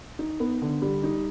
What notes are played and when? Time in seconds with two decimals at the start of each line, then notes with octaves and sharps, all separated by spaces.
0.19 D#4
0.40 B3
0.62 D3
0.82 G3
1.04 D#4